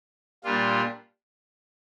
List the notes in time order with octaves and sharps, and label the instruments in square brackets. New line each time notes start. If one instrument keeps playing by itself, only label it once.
[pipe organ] A#2 G3 D4 F4